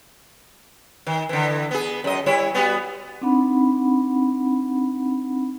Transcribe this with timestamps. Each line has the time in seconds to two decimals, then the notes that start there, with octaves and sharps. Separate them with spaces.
1.07 D#3
1.29 D3 E3
1.71 B3 G#4
2.04 F#2 D#5
2.26 G3 E4 C#5
2.54 G3 B3 F#4
3.21 C4 D4 D#4 F#5 B5